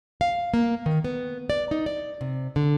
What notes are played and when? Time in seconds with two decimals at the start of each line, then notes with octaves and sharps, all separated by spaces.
0.21 F5
0.54 A#3
0.86 D#3
1.04 B3
1.50 D5
1.71 D#4
1.86 D5
2.21 C3
2.56 D3